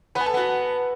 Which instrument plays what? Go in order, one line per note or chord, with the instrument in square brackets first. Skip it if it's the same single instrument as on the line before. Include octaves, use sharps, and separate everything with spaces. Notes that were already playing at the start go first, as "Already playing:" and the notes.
[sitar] B3 [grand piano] B4 B5
[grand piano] G#5
A4 A5
[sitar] B3 [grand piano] F#4 F#5